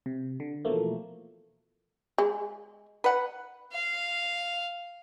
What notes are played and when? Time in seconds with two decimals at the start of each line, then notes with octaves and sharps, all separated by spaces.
0.06 C3
0.40 D3
0.65 B2 E3 F3 A3 A#3
2.18 G#3
3.04 B4 F#5
3.73 F5